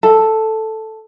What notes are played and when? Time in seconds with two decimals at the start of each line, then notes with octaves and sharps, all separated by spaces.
0.03 A4